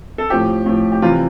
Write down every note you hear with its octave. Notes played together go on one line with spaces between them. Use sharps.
A4
A2 F3 G4
A2 F3
G4
C3 E3 G3 F4